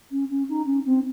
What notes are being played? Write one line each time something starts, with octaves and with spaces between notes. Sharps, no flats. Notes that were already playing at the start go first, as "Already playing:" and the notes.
C#4
C#4
D#4
C#4
C4